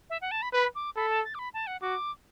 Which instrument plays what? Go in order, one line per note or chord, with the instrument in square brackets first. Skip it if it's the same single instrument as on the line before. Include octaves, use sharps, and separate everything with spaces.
[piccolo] E5
F#5
A5
B5
[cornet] B4 [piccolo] B5
[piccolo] D6
[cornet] A4 [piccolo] B5
[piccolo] A5
A6
D6
B5
A5
F#5
[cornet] F#4 [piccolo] D6